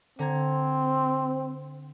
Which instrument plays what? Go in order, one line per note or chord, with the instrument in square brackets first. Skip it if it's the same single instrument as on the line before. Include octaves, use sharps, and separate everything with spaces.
[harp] D3 A#5 G#6 [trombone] C4